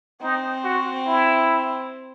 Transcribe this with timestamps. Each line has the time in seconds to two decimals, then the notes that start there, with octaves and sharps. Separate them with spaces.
0.22 C4 D#4
0.64 F#4
1.06 E4